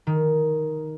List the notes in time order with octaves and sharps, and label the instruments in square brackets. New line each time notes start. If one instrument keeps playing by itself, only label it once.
[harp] D#3